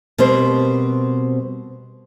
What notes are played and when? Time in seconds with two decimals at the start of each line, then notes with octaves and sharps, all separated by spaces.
0.18 B2 G3 C4 A#4 C5